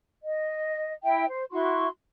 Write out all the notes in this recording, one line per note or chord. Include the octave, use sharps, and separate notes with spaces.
D#5
E4 E5 G5
C5
E4 F#4 C6 C#6